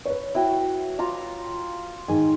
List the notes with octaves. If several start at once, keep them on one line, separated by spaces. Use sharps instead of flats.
B4 C#5
E4 F#4 G5
F4 A#5 D6
G#2 D#3 G#5